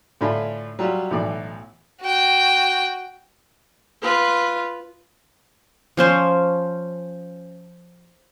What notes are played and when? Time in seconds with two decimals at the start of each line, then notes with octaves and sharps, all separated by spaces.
0.21 A2 D3 D4 F4 G#5 B5
0.79 F#3 G3 F4 G4
1.11 B1 A2 E3 D5
2.01 F#4 G5
4.02 F4 B4
5.97 F3 C#4 C5